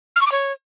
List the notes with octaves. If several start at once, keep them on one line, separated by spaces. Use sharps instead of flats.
F6
C#6
D6
C#5